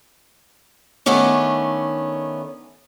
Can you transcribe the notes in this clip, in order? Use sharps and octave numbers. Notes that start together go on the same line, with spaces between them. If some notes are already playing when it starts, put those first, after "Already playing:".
D#3 A3 B3 C#4 D4